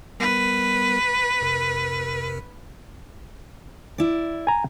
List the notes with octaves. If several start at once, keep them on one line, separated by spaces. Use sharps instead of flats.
G3 B3 A#4 B4
F2 C3 A#4
E4 D5
G#5 A#5